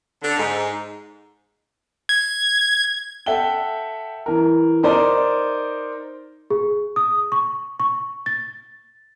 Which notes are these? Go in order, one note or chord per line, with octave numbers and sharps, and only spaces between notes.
D3
G#2
G#6
A4 E5 F#5 G5 G7
E3 A#4
D#4 A#4 C5 D5 D#5
G#4
D#6
C#6
C#6
A6